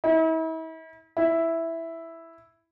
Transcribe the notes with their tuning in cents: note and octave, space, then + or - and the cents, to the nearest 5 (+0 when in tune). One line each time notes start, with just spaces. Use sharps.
E4 -40
E4 +0